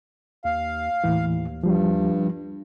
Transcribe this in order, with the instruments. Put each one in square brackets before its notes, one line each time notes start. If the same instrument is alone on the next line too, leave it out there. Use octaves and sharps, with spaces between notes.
[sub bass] D#2 [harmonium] F5
[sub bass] D#2 [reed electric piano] A2 E3
[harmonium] G2 [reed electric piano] F3 G3